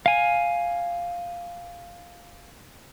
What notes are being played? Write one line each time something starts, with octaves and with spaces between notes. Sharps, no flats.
F5 G#5